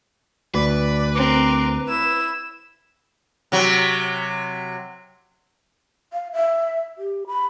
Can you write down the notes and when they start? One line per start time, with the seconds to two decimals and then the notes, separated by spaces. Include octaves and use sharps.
0.55 D2 B4 D5
1.15 C4 A#4 D6
1.88 E4 B5 E7
3.52 C3 F#3
6.13 F5
6.33 E5
6.98 G4
7.27 B5